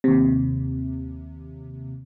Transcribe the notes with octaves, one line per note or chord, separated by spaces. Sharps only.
D#2 C3